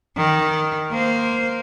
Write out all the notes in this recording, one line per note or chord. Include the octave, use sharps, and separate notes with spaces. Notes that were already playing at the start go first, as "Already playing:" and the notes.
D#3
A#3 C5